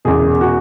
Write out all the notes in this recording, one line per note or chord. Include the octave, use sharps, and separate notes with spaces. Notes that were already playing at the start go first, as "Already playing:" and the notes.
E1 E2 C#3 G#4
F#4